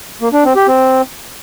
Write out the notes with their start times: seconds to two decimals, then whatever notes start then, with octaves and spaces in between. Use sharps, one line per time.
0.21 A#3
0.33 D4
0.44 C4
0.56 G4
0.68 C4